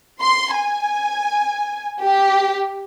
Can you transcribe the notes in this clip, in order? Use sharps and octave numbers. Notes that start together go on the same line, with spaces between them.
C6
G#5
G4